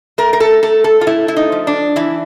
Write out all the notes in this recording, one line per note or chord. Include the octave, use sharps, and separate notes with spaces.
A3 A#4
A#4
A4
A3 A4
A4
F4
A3 E4
E4
D#4
F3
D4
E3 E4